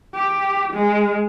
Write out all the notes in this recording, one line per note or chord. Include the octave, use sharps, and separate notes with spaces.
G4
G#3